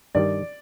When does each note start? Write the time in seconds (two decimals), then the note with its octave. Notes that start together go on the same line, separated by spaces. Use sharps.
0.15 G2 D#3 G3 D5